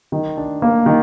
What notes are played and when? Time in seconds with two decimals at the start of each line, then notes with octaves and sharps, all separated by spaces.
0.12 D#3
0.37 D4
0.62 A#3
0.86 D#3